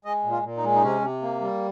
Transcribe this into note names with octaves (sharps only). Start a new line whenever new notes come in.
G#3 D#5
A#2
F4
A#2
D#4
G#3
D#4
C3 C#4
C3
A#3
G3